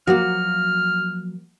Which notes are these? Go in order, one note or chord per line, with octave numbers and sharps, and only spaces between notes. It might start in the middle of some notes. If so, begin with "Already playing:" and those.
F3 F#3 A#3 F#4 F6